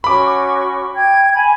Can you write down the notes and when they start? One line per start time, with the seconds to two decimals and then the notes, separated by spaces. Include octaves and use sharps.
0.04 C#4 F#4 B5 C#6 D6
0.96 G5 G#6
1.34 G#5 B5